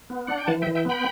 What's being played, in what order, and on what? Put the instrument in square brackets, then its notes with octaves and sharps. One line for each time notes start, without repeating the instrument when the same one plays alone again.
[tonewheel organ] B3
D4 F#5
G5
E3 F#5 A5
E5 G5
E3
E5 G5
B3 G5 B5